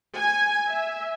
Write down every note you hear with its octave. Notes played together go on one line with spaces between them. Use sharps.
G#5
E5